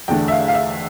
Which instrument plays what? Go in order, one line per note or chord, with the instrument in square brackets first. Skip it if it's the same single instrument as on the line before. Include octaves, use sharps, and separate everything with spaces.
[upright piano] E2 D3 A3 G5
E5
F5
F5
E5